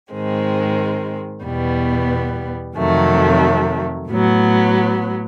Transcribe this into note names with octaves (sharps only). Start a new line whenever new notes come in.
G#2 D#3 G#3 C4
E2 B2 G3 B3
F2 C3 D#3 F#3 A3
A2 F#3 B3